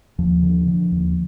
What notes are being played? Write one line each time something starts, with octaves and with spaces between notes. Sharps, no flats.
D#2 F3
D3
D3
D#2